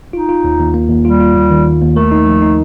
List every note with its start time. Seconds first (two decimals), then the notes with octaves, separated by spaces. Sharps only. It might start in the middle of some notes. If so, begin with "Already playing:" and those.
0.13 D#4 F4
0.29 F4
0.44 D#2
0.59 D#2
0.74 A#3
0.90 D#2
1.05 G3 F4
1.20 F4
1.35 D#2
1.51 D#3
1.66 D#2
1.81 D#2
1.96 A3 A#4
2.11 D#4
2.26 F3
2.42 D#4